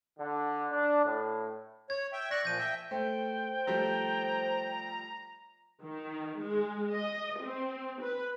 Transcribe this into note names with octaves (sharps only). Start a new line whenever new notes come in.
D3
D4
A2
C#5 G#6
E5 G5
D5 C#6 F#6 A#6
A#2 F3 G6 D#7
E5 G5
A3 C5 G5
F3 G3 A3 A#5
D#3
G#3
D#5
C4
B4